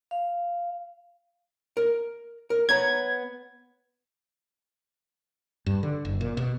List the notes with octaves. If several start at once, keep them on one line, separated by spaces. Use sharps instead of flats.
F5
A#4
A#4
B3 C#5 A#5 G#6
G2
D3
F#1
A#2
B2